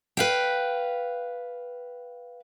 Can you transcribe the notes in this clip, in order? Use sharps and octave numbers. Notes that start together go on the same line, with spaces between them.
B4 F5 G5